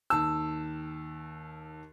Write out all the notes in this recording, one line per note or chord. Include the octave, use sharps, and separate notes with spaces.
D#2 A5 E6